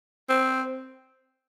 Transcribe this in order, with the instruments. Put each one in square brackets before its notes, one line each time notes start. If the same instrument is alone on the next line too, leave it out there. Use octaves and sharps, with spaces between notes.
[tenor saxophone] C4